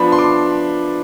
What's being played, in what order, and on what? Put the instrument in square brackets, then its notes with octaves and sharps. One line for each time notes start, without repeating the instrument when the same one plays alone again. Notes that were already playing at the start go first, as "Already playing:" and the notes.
Already playing: [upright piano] F3 B3 D4 B5
C6
D6